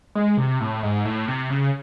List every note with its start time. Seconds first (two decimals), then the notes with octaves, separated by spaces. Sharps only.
0.15 G#3
0.38 C3
0.61 A2
0.83 G#2
1.05 A2
1.28 C3
1.50 C#3